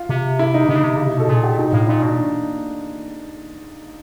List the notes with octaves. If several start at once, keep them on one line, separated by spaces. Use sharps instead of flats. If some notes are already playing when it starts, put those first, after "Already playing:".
Already playing: F4
C3
E4
D#4
C3 D#4
C#3
C3
C#3
C3
B2 A4
A#2 G#4
G4
B2 D#4
A2 F4
A#2 D#4
B2 D4